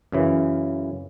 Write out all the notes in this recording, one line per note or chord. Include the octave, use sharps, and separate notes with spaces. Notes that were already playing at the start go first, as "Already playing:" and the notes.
F#2 C#3 E3